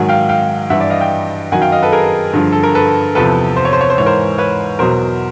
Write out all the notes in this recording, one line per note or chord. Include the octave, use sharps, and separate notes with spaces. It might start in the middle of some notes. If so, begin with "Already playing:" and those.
Already playing: G#2 D#3 F#3 F#5 G#5
F5 G5
F5 G5
G2 E3 E5 F#5
D5 E5
D#5 F5
F5 G5
F#2 D#3 F#3 F#5 G#5
F5 G5
D#5 F5
A4 B4
G#4 A#4
G2 D3 F3
A4
A#4
A4 B4
E2 C3 F3 A4 B4
C5
C#5
C5
C#5
C5
G#2 E3 C#5
A#4 C5
B4 C#5
E2 B2 F#3 A#4 C5